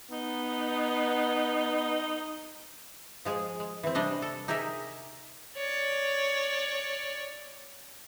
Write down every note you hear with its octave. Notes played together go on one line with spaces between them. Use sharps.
B3 D#4
F3 G#3 G#4
G#3
E3 C4
C3 G3 D4 D#5
A4
D#4 G4 G#4 A#4 E5
C#5 D5